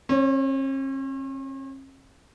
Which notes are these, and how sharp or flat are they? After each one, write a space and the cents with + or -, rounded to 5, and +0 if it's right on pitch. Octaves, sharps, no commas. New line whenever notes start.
C#4 -45 C#5 +15